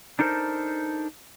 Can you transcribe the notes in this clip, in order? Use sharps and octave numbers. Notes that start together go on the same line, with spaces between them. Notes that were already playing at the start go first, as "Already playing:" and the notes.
D4 D#4 A4 A#4 C5